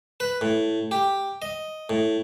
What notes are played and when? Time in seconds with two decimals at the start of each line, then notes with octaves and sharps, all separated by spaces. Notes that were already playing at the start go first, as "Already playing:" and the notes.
0.20 B4
0.41 A2
0.91 G4
1.42 D#5
1.89 A2